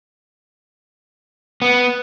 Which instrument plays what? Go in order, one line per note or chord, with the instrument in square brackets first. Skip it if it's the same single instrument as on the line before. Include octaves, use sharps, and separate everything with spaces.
[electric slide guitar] B3